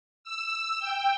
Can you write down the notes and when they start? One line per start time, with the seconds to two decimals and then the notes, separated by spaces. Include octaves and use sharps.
0.24 E6
0.80 G5